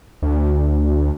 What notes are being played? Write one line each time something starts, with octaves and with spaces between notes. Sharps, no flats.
D2